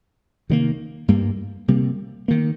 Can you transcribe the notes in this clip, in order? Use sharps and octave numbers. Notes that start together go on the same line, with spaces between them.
C3 D#3 G3 A#3
G2 G3 A#3
C3 G3 A#3
D#3 A#3